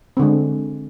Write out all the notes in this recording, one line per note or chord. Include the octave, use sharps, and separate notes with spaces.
D3 G#3 C4